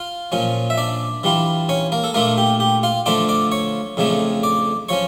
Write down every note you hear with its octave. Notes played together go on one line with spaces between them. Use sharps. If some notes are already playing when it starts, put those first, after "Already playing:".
Already playing: F4 F5
A#2 F3 C#4
E5
D4 D5
E3 G3 D4 F4
C#4 C#5
A#3 A#4
A4
A#2 A3 A#3 D4 F4 A#4
G4
G4
F4 F5
D3 F3 A3 D4 F4 D5 D6
D5 D6
C#5 C#6
F2 C#3 F3 A3 D4
D5 D6
F3 C#4 C#5 C#6